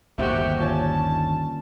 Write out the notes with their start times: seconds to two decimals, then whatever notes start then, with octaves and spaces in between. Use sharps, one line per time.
0.18 G1 D#2 C3 D#3 A3 F#4 G4
0.59 A#2 C#4 A5